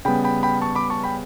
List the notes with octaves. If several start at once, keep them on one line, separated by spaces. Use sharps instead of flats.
C#3 G3 B3 G5 B5
G5 B5
G5 B5
A5 C#6
B5 D6
A5 C#6
G5 B5